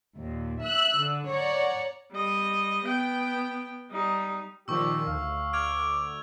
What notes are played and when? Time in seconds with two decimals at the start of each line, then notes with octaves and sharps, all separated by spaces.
0.18 D#2 A#2
0.62 E5 E6 F#6
0.97 D3
1.29 C#5 D5 F#5 A#5
2.13 G3 D#5
2.85 B3 G5
3.91 G3 D#4
4.68 A#2 D#3 F3 G4 C#6 E6
5.07 D2 F5
5.53 D6 F6 G#6 F7